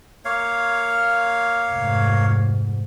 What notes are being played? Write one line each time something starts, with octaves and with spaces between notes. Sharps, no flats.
A#3 C#5 F5
F1 G#2